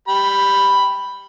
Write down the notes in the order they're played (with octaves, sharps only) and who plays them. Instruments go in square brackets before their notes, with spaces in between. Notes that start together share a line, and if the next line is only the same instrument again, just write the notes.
[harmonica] G4 B5